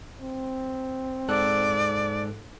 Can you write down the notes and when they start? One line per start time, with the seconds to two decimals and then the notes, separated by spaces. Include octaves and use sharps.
0.21 C4
1.29 G#2 A4 D5 F#6